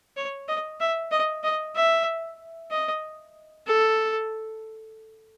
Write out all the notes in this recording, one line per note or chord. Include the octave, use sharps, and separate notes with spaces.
C#5
D#5
E5
D#5
D#5
E5
D#5
A4